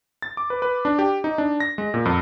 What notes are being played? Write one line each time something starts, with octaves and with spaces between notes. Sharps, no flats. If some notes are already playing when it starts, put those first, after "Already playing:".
A6
D6
B4
B4
D4
G4
D#4
D4
A#6
G#3
A#2
F2